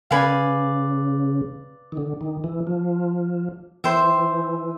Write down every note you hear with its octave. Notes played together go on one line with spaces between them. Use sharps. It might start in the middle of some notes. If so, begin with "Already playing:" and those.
C#3 B4 D5 F5 G#5
D#3
D3
D#3
E3
F3
E3 C5 E5 G5